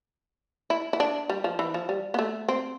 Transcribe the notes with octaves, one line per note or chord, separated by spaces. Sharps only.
E4
E4
D4
G3
F3
E3
F3
G3
B3
A3
C4